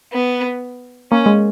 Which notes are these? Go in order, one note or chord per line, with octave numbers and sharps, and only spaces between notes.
B3
A#3 C#4
G#3